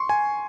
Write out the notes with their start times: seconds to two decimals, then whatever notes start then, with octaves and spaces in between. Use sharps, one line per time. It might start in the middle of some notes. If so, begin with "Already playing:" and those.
Already playing: C6 C#6
0.09 G#5